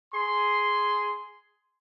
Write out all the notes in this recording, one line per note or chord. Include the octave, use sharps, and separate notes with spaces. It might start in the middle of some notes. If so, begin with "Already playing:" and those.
G#4 C6